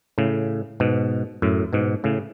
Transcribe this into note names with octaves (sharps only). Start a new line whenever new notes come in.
A2 C#3
G#2 B2
F#2 A2
G#2 B2
A2 C#3